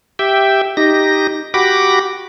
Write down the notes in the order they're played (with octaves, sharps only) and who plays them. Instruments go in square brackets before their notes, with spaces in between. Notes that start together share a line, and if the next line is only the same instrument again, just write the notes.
[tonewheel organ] G4 E5 G5
D#4 G4 A#6
F#4 G4 B5 D6 A#6